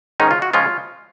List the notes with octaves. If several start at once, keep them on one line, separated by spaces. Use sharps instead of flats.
G#2 D#3 G#3 C#4 D#4
F4
F#4
C#3 F3 G#3 C#4 F4